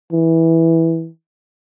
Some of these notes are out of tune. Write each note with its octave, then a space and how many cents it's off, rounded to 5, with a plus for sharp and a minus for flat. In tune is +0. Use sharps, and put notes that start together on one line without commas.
E3 -10